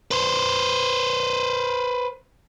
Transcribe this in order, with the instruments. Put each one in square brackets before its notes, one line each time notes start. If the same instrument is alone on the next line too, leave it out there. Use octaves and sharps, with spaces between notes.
[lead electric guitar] B4 C5